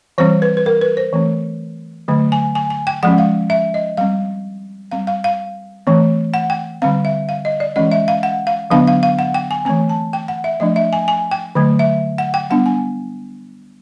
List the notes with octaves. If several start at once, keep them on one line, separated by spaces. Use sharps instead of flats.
E3 G3 C4 C5
B4
B4
A#4
B4
C5
E3 A3 C4
D3 F#3 A3
G#5
G#5
G#5
G5
F3 G#3 C#4 F#5
F5
E5
D#5
G3 C4 F5
G3 C4 F5
F5
F5
E3 A3 C4
F#5
G5
D3 G3 C4 F5
E5
F5
D#5
D5
E3 G#3 C#4 D#5
E5
F5
F#5
F5
D3 F#3 B3 D4 F5
F5
F5
F#5
G5
G#5
E3 A3 C4 G#5
A5
G5
F#5
E5
F3 A3 D4 D#5
E5
G#5
G#5
G5
D3 F#3 A3
E5
F#5
G5
G3 B3 D4 F#5
G#5